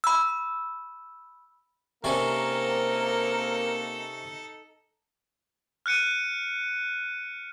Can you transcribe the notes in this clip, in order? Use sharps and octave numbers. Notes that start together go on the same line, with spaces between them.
B5 E6
C3 A#3 C4 C#4 D#4 A4 A#4 D5
F6 F#6 C#7 D#7